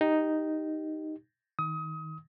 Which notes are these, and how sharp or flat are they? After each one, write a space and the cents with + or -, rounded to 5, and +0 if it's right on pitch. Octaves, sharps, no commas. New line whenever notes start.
D#4 +0 G4 +0
D#3 +15 D#6 +30